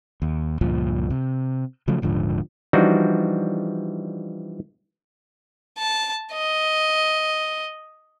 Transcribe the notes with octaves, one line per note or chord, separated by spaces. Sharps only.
D#2
C#2 G2 A#2 F3
C3
C#3 F3 F#3 A3
D#1 G#2 D3 F3
E3 F3 G3 D4 D#4 F#4
A5
D#5